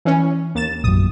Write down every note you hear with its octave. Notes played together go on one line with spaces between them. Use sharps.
E3 C#4
D#2 A6 E7
A#1 F#2 D#6